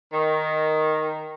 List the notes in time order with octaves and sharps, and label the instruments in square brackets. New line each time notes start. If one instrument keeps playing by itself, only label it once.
[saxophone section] D#3